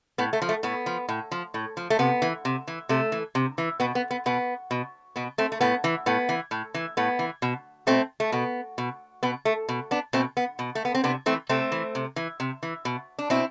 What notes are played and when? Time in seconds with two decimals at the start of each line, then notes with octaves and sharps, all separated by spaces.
0.18 A2 B3
0.33 A3
0.42 F3
0.49 A3
0.63 A2 B3
0.86 F3
1.09 A2
1.32 F3
1.54 A2
1.77 F3
1.90 A3
1.99 C3 B3
2.22 E3
2.45 C3
2.68 E3
2.89 C3 A3
3.12 E3
3.35 C3
3.58 E3
3.80 B2 B3
3.95 B3
4.11 B3
4.26 B2 B3
4.71 B2
5.16 B2 B3
5.38 A3 C4
5.52 A3
5.61 A2 B3
5.84 E3
6.06 A2 B3
6.29 E3
6.51 A2
6.74 E3
6.97 A2 B3
7.19 E3
7.42 B2
7.87 B2 A3 C4
8.20 A3
8.32 B2 B3
8.78 B2
9.23 B2 B3
9.45 A3
9.69 B2
9.91 B3 D4
10.13 B2 A3 C4
10.37 B3
10.59 B2
10.75 A3
10.85 B3
10.95 C4
11.04 C3 B3 D4
11.26 E3 A3 C4
11.49 C3 A3 C4
11.72 E3
11.95 C3
12.16 E3
12.40 C3
12.63 E3
12.85 B2
13.19 D4
13.30 B2 C4 E4